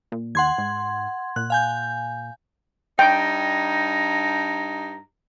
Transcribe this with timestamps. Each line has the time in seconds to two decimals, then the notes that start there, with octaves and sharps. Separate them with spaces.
0.12 A#2
0.35 D#2 F#5 C6 G#6
0.58 G#2
1.36 A#2 F#6
1.50 F5 G#5 G6
2.99 G2 D#4 G5 A#5